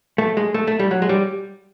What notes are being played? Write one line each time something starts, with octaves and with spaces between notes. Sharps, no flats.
A3
G#3
A3
A3
G3
F#3
G#3
G3